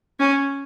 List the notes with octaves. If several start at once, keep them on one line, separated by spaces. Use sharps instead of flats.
C#4